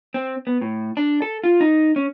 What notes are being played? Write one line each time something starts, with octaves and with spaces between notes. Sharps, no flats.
C4
B3
A2
D4
A4
F4
D#4
C#4